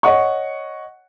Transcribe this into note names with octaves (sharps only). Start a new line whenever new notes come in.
C#5 D#5 F#5 C#6